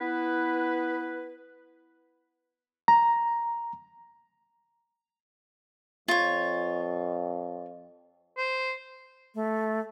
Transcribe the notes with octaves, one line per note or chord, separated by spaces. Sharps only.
B3 E4 B4
A#5
F2 F4 C#5
C5
A3